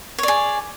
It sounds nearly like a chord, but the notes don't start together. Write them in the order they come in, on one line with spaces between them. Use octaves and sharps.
C#5 D5 G#4